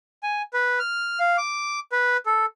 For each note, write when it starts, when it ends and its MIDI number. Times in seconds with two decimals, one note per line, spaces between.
0.23 0.42 80
0.54 0.79 71
0.79 1.20 89
1.20 1.37 77
1.38 1.80 86
1.92 2.17 71
2.26 2.46 69